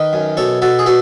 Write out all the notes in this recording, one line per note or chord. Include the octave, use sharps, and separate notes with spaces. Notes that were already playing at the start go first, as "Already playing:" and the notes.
Already playing: D#3 B4 D#5
F#2
B2 A4 C#5
B2 F#4 A4
G#4
B2 F#4 A4